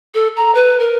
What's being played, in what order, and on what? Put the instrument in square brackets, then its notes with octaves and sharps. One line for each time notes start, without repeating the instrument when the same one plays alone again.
[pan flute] A4
A#5
B4
A#4